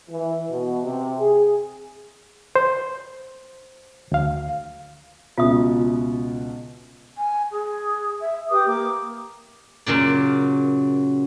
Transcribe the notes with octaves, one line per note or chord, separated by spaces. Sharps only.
E3
B2
C3
G#4
C5
D2 F5
C#2 B2 F4 E5 D#6
G#5
G#4
E5
G4 B4 D6 D#6
A#3 D6
F#2 A#2 C#3 D5